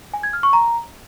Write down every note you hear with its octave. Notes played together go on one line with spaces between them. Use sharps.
G#5
G#6
F6
C#6
A#5